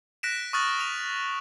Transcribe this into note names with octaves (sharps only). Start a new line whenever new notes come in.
F#6 A#6 B6 D7 E7
C#6 D#6 F6 F#6 A6 F#7
D#6 D7 F7